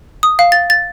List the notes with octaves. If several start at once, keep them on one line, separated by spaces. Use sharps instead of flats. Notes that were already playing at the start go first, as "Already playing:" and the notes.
D#6
F5
A6
A6